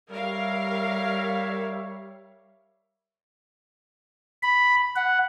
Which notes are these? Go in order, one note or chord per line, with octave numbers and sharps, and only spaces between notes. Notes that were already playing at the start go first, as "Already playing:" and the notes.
G3 G4 A#4 C#5 E5 F5
B5
F#5